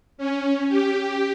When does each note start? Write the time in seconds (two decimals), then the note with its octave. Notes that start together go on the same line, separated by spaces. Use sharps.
0.18 C#4
0.69 G4